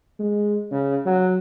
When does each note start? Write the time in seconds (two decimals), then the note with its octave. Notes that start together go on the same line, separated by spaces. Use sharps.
0.19 G#3
0.71 C#3
1.05 F#3